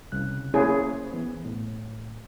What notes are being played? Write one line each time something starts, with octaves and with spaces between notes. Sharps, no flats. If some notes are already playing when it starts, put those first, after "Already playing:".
C2 C#3 F#6
A#3 C#4 E4 G#4 C5
E3 B3
A2